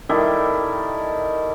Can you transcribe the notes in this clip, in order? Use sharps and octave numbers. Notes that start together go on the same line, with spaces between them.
D#3 G3 E4 A4